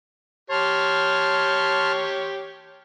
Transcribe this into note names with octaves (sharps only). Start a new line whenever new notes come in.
G4 C#5 A5 C6 F6